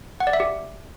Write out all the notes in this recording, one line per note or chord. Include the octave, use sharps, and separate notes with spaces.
F#5
D5
E5
G4